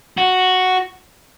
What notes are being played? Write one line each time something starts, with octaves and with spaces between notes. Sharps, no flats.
F#4